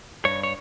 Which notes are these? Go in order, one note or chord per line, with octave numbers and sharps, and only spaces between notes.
G2 C#5
C#5